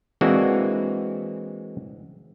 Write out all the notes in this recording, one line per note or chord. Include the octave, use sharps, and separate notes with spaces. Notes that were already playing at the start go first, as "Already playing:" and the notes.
E3 G#3 A#3 C4 D4 F#4